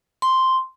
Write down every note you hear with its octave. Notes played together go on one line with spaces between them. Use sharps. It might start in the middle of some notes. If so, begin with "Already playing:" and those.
C6